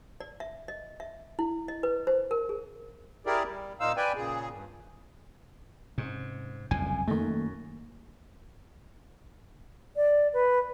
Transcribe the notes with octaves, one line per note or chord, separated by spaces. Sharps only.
D5
E5
D#5
E5
E4
D#5
B4
C5
A#4
G#4
E4 G4 G#4 A#4 D5
G3
A#2 D#4 C5 F5 E6
B4 D5 G5 G#5
A#2 C#3 G#4
G2
G#2 C3 C#4
F#1 C2 F2 A2 G#5
F#2 D#3 A3 A#3
D5
B4